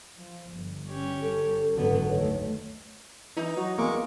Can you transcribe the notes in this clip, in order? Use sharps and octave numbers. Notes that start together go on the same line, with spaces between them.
F3
G1
C#4 G4 C#5
A4
F#1 C#2 G#2 D3 F#3 B3
D2 D#3 A3 C#5
E3 D#4
F#3 F#4
E2 G#3 A#3 C#6 D6